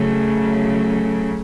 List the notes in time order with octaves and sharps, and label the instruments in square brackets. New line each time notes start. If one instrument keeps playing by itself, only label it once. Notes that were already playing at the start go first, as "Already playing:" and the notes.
Already playing: [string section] C#3 F#3 A3